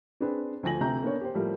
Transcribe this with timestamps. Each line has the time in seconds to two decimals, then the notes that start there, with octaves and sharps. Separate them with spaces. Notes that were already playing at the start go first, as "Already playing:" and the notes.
0.20 C4 D4 G#4 B4
0.63 D2 F3 G#5 A#6 F#7
0.80 D2 C3 G4 A#5 G6
1.03 A#3 B3 D4 C#5
1.21 G4 C5
1.34 A2 F3 G3 A#3